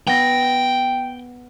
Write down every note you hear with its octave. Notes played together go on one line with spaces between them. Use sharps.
B3 G5 A#6